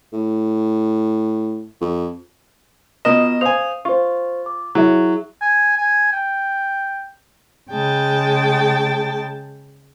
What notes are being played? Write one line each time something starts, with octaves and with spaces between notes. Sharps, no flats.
A2
F2
B2 F4 A#4 D#5 E7
C5 F5 G#5 D#6 F7
F4 C5 C#6
D6
F#3 E4 G#4 E5
G#5
G#5
G5
C#3 G#3 G5 A5